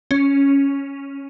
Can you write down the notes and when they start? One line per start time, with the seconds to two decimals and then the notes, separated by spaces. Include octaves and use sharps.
0.11 C#4